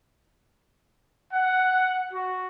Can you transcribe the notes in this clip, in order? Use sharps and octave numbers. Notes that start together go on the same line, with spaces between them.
F#5
F#4